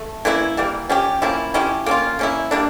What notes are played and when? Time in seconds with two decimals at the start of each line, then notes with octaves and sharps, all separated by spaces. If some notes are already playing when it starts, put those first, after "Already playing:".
Already playing: A3
0.25 E3 A#3 C#4 E4
0.57 E3 G3 A#3
0.89 F3 C#4 G4
1.22 F3 A#3 C#4 E4
1.54 F3 C#4 E4 G4
1.86 A#3 C#4 F4
2.19 A#3 C#4 E4
2.51 G3 A#3 D4